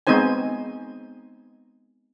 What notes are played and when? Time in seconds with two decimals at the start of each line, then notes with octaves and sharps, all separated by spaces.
0.07 G#3 B3 C4 D#4 C5 G#5